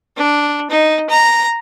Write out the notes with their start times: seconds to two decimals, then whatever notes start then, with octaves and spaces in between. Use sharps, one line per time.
0.17 D4
0.70 D#4
1.09 A#5